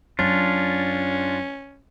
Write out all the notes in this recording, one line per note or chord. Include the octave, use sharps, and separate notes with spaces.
F#2 C#4 D4 F4